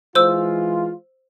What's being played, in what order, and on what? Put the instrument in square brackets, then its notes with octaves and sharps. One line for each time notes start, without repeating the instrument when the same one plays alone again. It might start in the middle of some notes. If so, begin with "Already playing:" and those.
[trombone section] E3 G#3 F4 [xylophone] C5 E6